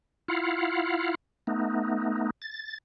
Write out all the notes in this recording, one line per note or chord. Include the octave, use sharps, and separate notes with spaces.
E4 F4 F5 F#5
A3 B3 D#4
A6